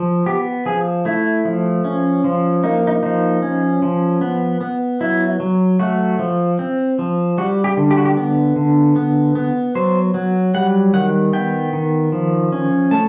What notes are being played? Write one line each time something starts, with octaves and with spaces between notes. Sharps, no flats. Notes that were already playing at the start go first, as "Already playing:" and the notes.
Already playing: F3
B3 G4
F3 G#4
A3 E4
F3
C#4
F3
A#3 D#4
D#4
F3 D#4
C#4
F3
B3
B3
F#3 E4
F#3
A3 F#4
F3
C4
F3
G3 F#4
G4
D3
G4
F#4
G4
B3
D3
B3
B3
F#3 C5
F#3
G3 F#5
D#3 F#5
B3 G5
D#3
F3
C#4
A3 A5